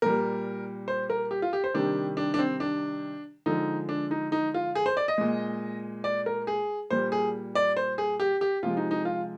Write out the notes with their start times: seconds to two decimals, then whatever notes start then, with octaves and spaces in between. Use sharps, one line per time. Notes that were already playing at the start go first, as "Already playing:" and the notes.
0.02 A#2 G3 A#4
0.88 C5
1.10 A#4
1.31 G4
1.42 F4
1.53 G4
1.64 C5
1.74 C3 D#3 G3 D4
2.17 D4
2.34 D4
2.39 C4
2.60 D4
3.46 D3 F3 G#3 D#4
3.89 D4
4.11 D#4
4.32 D#4
4.54 F4
4.75 G#4
4.86 C5
4.97 D5
5.08 D#5
5.18 A#2 G#3
6.04 D5
6.26 A#4
6.47 G#4
6.90 A#2 G3 C5
7.12 G#4
7.55 D5
7.77 C5
7.98 G#4
8.20 G4
8.41 G4
8.63 C3 F3 G#3 F4
8.77 D#4
8.91 D#4
9.05 F4